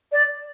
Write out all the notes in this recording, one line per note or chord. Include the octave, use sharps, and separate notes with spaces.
D5